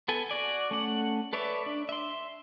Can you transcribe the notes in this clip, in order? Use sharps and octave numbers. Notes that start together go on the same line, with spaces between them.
B3 A4 G#5
F#4 D5 G#5
A3 C#4 F#5
A4 B4 C#5 D5 E5
D4
E5 C6